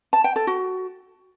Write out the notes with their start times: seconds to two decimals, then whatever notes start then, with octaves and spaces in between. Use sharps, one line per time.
0.13 A5
0.24 G5
0.36 A4
0.47 F#4